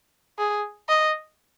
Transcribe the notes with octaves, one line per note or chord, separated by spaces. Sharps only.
G#4
D#5